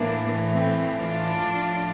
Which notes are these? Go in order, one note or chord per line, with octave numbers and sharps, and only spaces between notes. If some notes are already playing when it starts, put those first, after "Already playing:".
Already playing: A2 E3 A#3 D4
A3 C4
D4 F4
A2 F3